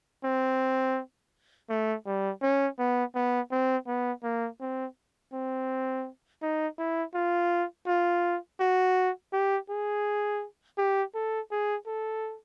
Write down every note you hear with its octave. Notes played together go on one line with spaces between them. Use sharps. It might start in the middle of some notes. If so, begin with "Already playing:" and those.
C4
A3
G3
C#4
B3
B3
C4
B3
A#3
C4
C4
D#4
E4
F4
F4
F#4
G4
G#4
G4
A4
G#4
A4